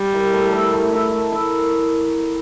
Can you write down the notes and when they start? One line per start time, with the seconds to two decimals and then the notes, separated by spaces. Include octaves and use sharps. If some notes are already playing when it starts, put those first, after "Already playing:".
Already playing: G3
0.13 E4 A#4 E5
0.33 A3
0.52 E4 A#4 E5
0.73 A3
0.92 E4 A#4 E5
1.12 A3
1.32 E4 A#4